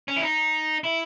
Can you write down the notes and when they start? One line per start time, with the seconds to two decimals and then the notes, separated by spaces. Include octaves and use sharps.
0.08 C#4
0.16 E4
0.23 D#4
0.84 E4